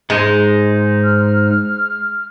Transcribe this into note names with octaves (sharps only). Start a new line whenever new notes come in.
G#2 G#3 D#4
F6